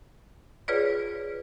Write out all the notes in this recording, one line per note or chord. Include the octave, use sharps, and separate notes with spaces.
F4 G#4 B4 C#5 D5